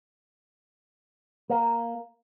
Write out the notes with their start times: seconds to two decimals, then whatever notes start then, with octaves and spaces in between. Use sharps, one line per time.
1.50 A#3